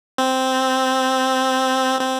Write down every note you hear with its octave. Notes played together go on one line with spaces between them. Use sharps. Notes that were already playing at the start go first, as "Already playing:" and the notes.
C4
C4